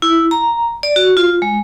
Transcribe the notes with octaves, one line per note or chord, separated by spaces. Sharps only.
E4
A#5
D5
F#4
F4
G#3